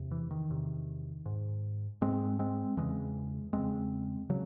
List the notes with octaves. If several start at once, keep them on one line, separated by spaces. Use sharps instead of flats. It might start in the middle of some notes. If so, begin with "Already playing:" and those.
Already playing: E2 C3
E3
D#3
E2 C3
G#2
G#2 G#3 C4
G#3 C4
E2 C#3 E3 G#3
E2 C#3 G#3 C4
C#3 F#3